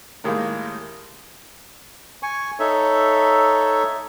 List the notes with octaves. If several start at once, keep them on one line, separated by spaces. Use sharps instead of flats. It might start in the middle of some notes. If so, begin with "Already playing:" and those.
A2 D#3 G3 G#3 A#3
G#5 C#6
D#4 A4 C#5 E5